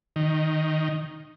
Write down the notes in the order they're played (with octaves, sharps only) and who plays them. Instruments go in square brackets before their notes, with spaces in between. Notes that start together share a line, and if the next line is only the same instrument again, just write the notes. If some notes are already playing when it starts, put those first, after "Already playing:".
[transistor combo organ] D#3